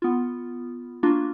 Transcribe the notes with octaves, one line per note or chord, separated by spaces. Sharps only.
B3 F4
A#3 D4 F4 F#4